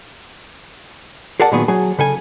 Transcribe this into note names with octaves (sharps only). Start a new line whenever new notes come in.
G#4 A#4 D5 F#5 A5
A#2 D#3 F#3 B3 G#4
F#3 G#4 G#5
C#3 A4 G#5